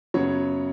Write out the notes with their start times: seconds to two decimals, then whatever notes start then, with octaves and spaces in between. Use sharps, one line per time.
0.14 F#2 C#3 F#3 B3 C#5